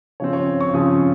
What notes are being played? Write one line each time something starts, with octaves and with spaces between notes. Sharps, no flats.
C#3 F3 C4 C#5
C#5
C#6
C#3 F3 C4 D#6